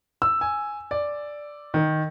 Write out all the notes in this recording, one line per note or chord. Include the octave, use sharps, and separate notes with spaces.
E6
G#5
D5
D#3